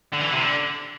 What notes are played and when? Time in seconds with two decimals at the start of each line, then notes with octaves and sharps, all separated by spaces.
0.13 D3
0.21 E3
0.32 C3
0.42 D3